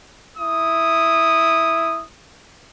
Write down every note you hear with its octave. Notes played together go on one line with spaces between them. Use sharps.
E4 D#6